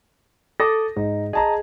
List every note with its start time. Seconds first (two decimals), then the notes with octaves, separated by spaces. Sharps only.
0.60 A4 D6 D#6 A#6
0.96 G#2 D#4
1.33 G#4 D#5 A5 A#5